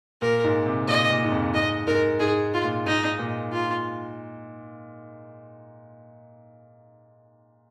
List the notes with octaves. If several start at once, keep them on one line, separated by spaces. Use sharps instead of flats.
A#2 A#4
G#2
C3
A#2 D#5
A#2
G#2
F2
G#2 D#5
G#2 A#4
G#2 G#4
F4
A#2
G#2 D#4
A#2
F4